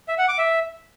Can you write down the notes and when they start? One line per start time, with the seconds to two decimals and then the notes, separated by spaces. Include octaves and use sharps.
0.08 E5
0.18 F#5
0.28 D6
0.38 E5